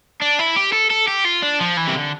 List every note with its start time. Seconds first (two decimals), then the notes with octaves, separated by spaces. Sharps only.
0.22 D4
0.39 E4
0.56 G4
0.73 A4
0.91 A4
1.08 G4
1.25 F4
1.43 D4
1.60 F3
1.77 E3
1.87 C3
1.94 D3